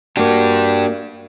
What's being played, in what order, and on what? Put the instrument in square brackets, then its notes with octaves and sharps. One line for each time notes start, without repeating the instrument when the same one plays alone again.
[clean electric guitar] A#3 F#4 [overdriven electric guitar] D4 G4